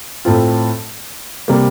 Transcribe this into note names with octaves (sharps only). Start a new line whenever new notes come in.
A2 A3 C4 F4
C3 G3 A#3